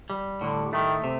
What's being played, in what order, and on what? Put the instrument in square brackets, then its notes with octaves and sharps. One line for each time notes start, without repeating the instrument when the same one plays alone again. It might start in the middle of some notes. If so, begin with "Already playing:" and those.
[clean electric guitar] G3
[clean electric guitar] A2 [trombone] D3
[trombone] D#3 [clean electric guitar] A3
[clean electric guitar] C3